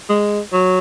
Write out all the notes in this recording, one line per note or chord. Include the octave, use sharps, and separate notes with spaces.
G#3
F#3